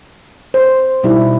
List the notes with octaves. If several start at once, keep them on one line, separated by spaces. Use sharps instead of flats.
C5
B2 G3 D#4 E4